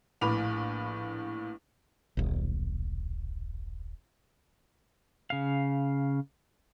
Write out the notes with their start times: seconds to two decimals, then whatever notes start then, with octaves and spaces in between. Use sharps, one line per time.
0.21 A#1 A2 B4 B5 D6 F7
2.17 D#1 B1
5.30 C#3 F5